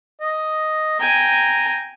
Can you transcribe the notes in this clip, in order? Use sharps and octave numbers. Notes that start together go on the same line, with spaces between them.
D#5
G5 G#5 A#5